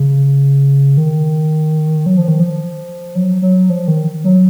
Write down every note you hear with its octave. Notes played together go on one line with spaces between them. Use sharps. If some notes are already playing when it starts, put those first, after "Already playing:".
Already playing: C#3
D#3
F#3
F3
D#3
F3
F#3
F#3
F3
D#3
F#3